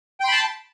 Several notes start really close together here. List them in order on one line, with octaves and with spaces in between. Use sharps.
G5 C6 B5 A5